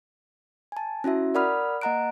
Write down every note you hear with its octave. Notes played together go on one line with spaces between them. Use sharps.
G#5 A5
C#4 E4 F#4 E5
A#4 D5 F#5 B5 D#6 F6
A#3 D#5 F#5 A#5 F#6 D7